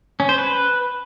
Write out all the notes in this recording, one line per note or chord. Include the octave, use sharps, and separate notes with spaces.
C#4
C5
B4